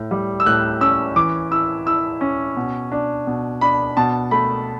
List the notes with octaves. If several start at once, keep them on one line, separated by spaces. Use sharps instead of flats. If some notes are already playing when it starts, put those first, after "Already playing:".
Already playing: A2
G3
E6
A2 F#6
C#4 E6
E3 D6
E4 E6
E4 E6
C#4
B2
D4
B2
D4 B5
B2 A5
A3 B5